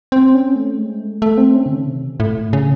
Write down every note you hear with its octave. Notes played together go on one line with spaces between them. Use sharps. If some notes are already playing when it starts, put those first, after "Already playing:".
C4
C#4
A3
G#3
A3
A3
C4
C#4
C#3
D#3
C3
A2
C#3